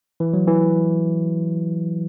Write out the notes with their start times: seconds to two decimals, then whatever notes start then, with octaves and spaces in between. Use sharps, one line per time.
0.20 E3
0.33 F#3
0.47 E3